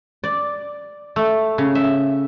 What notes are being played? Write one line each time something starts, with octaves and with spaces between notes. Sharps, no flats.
D5
A3
C#3
E5